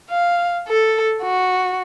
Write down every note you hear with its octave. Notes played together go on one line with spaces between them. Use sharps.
F5
A4
F#4